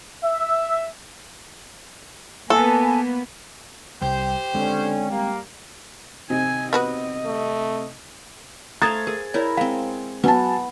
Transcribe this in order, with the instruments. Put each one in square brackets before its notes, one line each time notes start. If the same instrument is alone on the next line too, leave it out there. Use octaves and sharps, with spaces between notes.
[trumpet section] E5
[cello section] A#3 B3 [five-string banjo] A4 [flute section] G#5 A5
[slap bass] C2 G3 [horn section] G4 C5 [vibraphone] G5
[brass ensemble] D3 C#4 [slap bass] G#3 C4
[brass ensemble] G3 A#3
[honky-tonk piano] C3 C4 D#4 [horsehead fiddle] G#5
[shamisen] B3 F#4 B4 [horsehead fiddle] D#5
[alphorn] A3
[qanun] A3 C5 F5 [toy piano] A#5 D#6 [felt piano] G#6 A6
[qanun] G#4 [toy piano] A#4
[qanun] E4 A#4 [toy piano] C#5 D5
[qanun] G#3 C4 [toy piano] F5
[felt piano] F#3 G#5 A5 [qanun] B3 [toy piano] B4